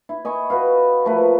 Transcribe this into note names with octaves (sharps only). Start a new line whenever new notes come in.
E4
D#5 G#5 B5 C#6
F#4 B4 F5
F3 A3 A#4 B4